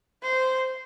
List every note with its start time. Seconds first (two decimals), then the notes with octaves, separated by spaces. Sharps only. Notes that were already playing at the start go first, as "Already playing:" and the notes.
0.23 C5